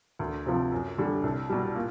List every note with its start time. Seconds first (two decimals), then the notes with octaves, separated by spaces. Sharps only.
0.19 D2
0.46 C3 F3
0.72 F#2
0.98 D3 G3
1.23 C2
1.50 B2 G3
1.75 A#2